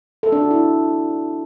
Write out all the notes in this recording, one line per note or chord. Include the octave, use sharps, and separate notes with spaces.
A4
D4
F#4
E4